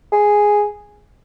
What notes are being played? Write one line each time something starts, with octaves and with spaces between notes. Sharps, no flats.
G#4